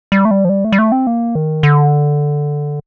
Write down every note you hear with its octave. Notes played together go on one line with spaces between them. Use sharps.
G3
A3
G3
F3
G3
A3
G3
A3
C4
A#3
D#3
D3